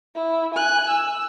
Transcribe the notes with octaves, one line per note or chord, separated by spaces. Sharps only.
E4
G#5 F#6
E6